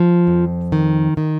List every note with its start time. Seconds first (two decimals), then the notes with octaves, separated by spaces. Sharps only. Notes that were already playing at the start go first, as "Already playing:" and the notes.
Already playing: F3
0.27 F2
0.72 D#3
1.17 D#3